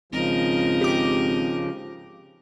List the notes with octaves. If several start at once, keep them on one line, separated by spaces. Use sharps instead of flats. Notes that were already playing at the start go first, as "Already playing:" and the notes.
G#1 C#3 F3 A#4 D#5
G4 D6